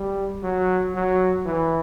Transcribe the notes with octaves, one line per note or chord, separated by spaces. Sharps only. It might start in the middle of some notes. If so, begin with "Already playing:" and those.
Already playing: G3
F#3
F#3
E3